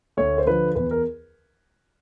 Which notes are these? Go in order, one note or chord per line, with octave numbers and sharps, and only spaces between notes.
D2 C#5
C5
D3 F3 B4
E2 B4
A#4